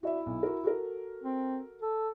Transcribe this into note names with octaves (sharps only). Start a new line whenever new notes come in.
E4 F#4 D5 E5
B1
F#4 A#4
F#4 A4 A#4
C4
A4